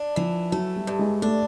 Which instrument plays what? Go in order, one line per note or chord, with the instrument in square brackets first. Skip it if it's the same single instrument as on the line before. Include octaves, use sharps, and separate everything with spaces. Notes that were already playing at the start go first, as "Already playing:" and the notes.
Already playing: [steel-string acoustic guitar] D4
[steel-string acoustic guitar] E3 [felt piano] F3
[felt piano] F#3 [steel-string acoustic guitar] A3
[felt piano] G3
[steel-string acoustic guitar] G2
[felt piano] G#3
[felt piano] A3 [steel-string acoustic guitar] D4